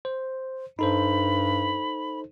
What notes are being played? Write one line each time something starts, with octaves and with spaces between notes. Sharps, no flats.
C5
G2 D#4 A4 C5 B5